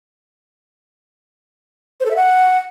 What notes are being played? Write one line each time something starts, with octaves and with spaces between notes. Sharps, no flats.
C5
A4
E5
F#5